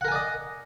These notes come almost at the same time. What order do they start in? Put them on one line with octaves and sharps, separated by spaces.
F#5 A#4 G#5 D5 D#5